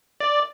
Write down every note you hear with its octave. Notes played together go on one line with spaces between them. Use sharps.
D5